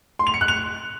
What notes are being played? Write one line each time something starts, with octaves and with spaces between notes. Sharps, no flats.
C6
F7
C#7
F#6
F7